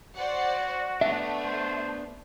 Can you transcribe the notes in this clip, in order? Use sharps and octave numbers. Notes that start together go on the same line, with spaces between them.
F#4 C5 D5 F#5
A3 B3 D4 E5
C5